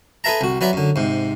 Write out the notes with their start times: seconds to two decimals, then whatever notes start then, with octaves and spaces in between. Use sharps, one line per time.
0.24 G#4 A4 B4 E5 A5 A#5
0.41 C2 F#4
0.61 F#3 B4 D5 E5
0.73 F#2 D3
0.96 G#2 C3